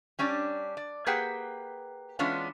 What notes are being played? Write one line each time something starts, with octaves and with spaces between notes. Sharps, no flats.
G3 C#4 D4 D5
D5
A#3 G4 G#4 B4 F#5 G5
E3 G#3 B3 C#4 D4 F4